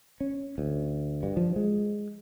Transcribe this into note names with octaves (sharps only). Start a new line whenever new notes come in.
C#4
D2
G2
F3
G#3